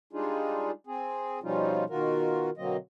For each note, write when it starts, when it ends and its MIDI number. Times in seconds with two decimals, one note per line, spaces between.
0.13 0.71 55
0.13 0.71 56
0.13 0.71 62
0.13 0.71 63
0.13 0.71 65
0.13 0.71 68
0.87 1.39 60
0.87 1.39 68
1.43 1.84 47
1.43 1.84 53
1.43 1.84 55
1.43 1.84 61
1.43 1.84 63
1.43 1.84 65
1.90 2.50 47
1.90 2.50 51
1.90 2.50 65
1.90 2.50 66
1.90 2.50 70
2.57 2.77 47
2.57 2.77 50
2.57 2.77 54
2.57 2.77 58
2.57 2.77 60
2.57 2.77 75